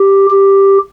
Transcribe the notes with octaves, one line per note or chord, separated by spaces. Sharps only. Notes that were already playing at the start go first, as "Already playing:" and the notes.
Already playing: G4
G4